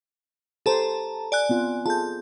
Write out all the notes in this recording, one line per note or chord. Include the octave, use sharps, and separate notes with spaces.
G4 A4 C5 A5 A#5
D5 G#5 F#6
B3 C4 F4
F4 G#4 A4 A5 G6